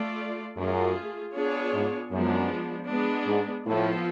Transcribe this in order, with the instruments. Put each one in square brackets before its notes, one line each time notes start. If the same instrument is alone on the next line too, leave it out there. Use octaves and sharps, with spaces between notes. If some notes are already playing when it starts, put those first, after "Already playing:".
Already playing: [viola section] A3 F4 A4 D5
[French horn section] F#2 [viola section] A3 F4 G#4
[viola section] B3 D4 F4 G#4 C#5
[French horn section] G#2
[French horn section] F#2 [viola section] F3 G#3 B3 D4
[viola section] G#3 B3 D4
[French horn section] G#2
[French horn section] A2 [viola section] F3 B3 F4 A4